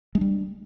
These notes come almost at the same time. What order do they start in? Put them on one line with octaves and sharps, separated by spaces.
G#3 D4 G3